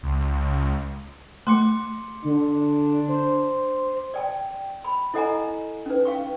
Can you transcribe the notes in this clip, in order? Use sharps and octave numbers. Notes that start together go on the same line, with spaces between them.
C#2
A3 C6 D6 C#7
D3 D4
C5
D5 G5 A5
B5
E4 A4 D#5 F#5 G#5 A#5
C#4 D#4 B4
F5 G5 C#6